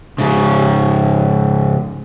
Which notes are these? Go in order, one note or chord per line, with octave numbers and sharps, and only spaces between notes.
G#2 C#3